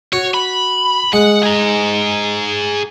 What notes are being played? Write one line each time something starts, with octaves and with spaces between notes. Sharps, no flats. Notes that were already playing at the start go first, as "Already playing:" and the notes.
F#4 C#5
B5
G#3 F#5
G#4 A#5